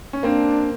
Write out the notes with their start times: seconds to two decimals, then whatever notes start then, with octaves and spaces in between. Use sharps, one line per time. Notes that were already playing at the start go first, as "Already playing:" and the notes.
0.13 C#4
0.23 A#3 C4 D4